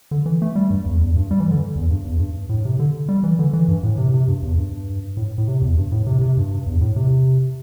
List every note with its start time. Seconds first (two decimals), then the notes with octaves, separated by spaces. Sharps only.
0.11 D3
0.26 E3
0.42 A3
0.55 G3
0.70 G2
0.86 E2
1.01 E2
1.16 G2
1.31 G3
1.40 E3
1.51 D3
1.76 E2
1.91 G2
2.05 E2
2.19 G2
2.49 A2
2.65 C3
2.79 D3
3.09 G3
3.23 E3
3.39 D3
3.53 E3
3.68 G2
3.83 A2
3.98 C3
4.14 C3
4.28 G2
4.43 E2
4.58 G2
5.17 A2
5.38 A2
5.48 C3
5.62 E2
5.77 G2
5.92 A2
6.07 C3
6.21 C3
6.37 G2
6.66 E2
6.81 A2
6.96 C3